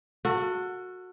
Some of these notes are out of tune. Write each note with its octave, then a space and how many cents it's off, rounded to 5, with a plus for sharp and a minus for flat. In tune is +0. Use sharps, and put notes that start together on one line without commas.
F#4 -15 A4 +30